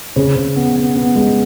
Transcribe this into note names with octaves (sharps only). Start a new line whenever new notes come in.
C#3
C#3
B3
B3
B3
G#3